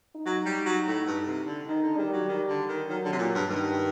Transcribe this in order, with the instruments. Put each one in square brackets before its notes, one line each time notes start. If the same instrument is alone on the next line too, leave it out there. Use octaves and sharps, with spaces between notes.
[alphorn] D#4
[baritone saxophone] F#3
G3
F#3
A2
G2
C3
D3
[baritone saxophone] D#3 [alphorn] D#4
[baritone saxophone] D3
[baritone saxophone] D#3 [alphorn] G3
[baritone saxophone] F#3
D#3
D3
D#3
[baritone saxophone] D#3 [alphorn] F#3
[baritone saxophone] D3
C3
A#2
G2
[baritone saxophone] G2 [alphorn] D#3